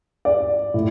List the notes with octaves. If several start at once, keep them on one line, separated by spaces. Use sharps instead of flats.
D5
A2